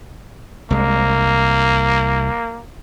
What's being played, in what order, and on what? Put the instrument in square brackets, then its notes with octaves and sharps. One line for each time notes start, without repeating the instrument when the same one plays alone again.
[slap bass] C2 G#3 [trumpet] A#3